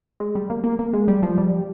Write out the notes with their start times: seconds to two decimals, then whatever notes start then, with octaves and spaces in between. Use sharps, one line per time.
0.20 G#3
0.35 G3
0.50 A#3
0.64 A#3
0.79 A#3
0.93 G#3
1.08 G3
1.22 F3
1.38 G3